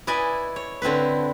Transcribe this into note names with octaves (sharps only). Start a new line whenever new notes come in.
E4 B4 D5 D#5 G#5
C#5
D3 C4 E4 B4